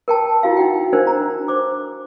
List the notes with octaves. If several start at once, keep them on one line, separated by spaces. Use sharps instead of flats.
A#4 G5 A5
E4 F#4 F5
D#4 F#5 G5
D4 A#4 C5
A#5
C5 D6